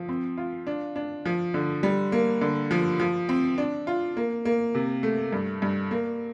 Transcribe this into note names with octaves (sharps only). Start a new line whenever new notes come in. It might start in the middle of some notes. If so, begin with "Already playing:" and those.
Already playing: F3
C4
F4
D4
D4
F3
D3
G3
A#3
D3
F3
F3
C4
D4
F4
A#3
A#3
C3
A3
G2
G2
A#3